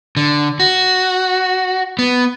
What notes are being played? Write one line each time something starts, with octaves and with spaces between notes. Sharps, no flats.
D3
F#4
B3